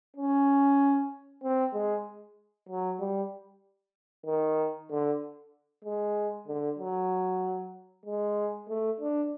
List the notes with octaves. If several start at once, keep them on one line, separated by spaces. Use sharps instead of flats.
C#4
C4
G#3
F#3
G3
D#3
D3
G#3
D3
F#3
G#3
A3
D4